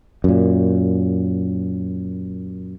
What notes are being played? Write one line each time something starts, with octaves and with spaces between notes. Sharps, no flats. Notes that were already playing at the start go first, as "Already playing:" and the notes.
F#2 A#2